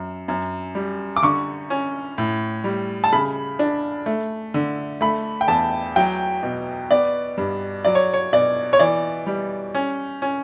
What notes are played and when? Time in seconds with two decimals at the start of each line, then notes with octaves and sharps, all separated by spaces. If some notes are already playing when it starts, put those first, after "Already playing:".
Already playing: F#2
0.28 F#2
0.75 G3
1.16 D6
1.23 D3 C#6
1.70 C#4
2.18 A2
2.64 G3
3.04 A5
3.12 C#3 B5
3.59 D4
4.06 A3
4.54 D3
5.01 A3 B5
5.41 G5
5.48 E2 A5
5.96 F#3 G5
6.43 B2
6.91 B3 D5
7.37 G2
7.85 F#3 D5
7.95 C#5
8.14 C#5
8.33 B2 D5
8.73 C#5
8.79 E3 D5
9.26 G3
9.75 C#4
10.22 C#4